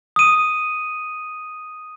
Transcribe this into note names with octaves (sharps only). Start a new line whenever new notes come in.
D#6 D#7